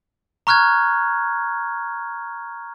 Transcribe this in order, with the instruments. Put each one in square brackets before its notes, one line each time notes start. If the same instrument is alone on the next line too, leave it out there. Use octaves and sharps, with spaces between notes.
[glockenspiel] A#5 C#6 F6 F#6 G#6